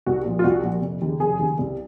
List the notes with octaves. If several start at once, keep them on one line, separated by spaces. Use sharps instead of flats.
C2 F#4
A#2 F3
F4
C2 F#4
A#2 F3
F1
D#2 C#3
F1 G#4
D#2 C#3
C2